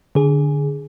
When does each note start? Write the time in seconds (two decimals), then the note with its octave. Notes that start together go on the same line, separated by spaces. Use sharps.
0.15 D3 G#4